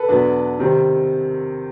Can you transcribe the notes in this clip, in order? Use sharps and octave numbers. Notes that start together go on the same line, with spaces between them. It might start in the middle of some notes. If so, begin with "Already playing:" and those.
Already playing: A4 B4
E2 B2 F#3 B3 D4
C3 D#3 G3 C4